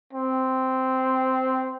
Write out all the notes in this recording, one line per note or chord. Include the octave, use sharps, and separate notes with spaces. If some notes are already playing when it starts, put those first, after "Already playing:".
C4